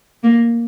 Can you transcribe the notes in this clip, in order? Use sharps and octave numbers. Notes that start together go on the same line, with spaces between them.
A#3